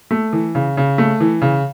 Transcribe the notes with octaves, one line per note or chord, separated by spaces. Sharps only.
A3
E3
C#3
C#3
A3
E3
C#3